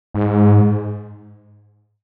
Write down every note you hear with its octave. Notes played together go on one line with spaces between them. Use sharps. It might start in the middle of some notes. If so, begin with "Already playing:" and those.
G#2